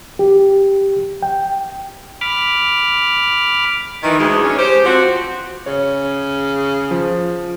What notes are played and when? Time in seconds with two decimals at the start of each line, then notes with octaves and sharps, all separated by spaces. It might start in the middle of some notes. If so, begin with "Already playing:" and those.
0.19 G4
1.23 G5
2.21 B5 D6 F6
4.03 D#3 E3
4.19 D2 G#3
4.44 C#4
4.58 G4 C5
4.84 F3 C4 F#4
5.66 C#3 C#5
6.91 F3